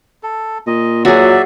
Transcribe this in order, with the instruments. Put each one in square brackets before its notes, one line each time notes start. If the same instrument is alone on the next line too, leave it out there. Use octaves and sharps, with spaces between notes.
[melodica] A4
[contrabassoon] A#2 [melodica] D#5
[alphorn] F#3 [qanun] F#4 G#4 [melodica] D5 E5